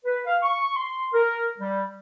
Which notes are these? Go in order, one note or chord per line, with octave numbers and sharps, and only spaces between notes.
B4
F5
C#6
C6
A#4
G3